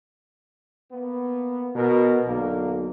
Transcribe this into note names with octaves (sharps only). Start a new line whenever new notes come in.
A#3 B3
B2 A#4
B1 D3 A#3